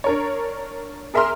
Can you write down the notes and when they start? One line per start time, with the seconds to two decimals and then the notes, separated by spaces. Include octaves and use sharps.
0.04 D4 A#4 C#5
1.14 G#4 A#4 E5 A#5 C6 F6